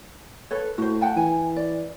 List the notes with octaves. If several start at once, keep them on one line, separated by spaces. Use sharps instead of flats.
A4 B4 C#5
A2 F#4 C5
F#5 G5 A5
E3 G#5
D5